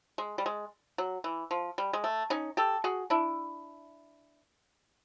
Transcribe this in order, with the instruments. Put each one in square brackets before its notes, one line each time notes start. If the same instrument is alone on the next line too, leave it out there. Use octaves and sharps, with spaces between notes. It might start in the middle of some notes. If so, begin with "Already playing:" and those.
[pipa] G#3
G3
G#3
F#3
E3
F3
G3
G#3
A3
C#4 D#4
G4 A4
F#4 G#4
D4 E4